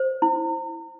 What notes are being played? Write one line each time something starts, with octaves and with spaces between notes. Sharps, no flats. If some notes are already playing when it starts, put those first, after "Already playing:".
Already playing: C5
E4